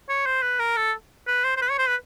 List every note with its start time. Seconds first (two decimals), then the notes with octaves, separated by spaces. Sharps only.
0.09 C#5
0.26 C5
0.42 B4
0.59 A#4
0.77 A4
1.27 B4
1.45 C5
1.57 C5
1.62 B4
1.70 C#5
1.78 C5
1.88 B4